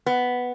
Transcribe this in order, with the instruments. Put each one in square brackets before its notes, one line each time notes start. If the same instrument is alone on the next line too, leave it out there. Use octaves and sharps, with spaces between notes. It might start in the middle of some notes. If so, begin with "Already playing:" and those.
[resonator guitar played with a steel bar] B3